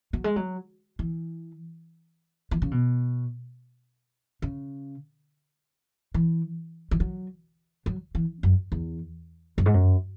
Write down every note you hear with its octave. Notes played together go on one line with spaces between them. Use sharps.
F#3
G#3
F#3
E3
E3
C#3
B2
C#3
E3
E3
F#3
F#3
E3
F#2
E2
F#2
G#2
F#2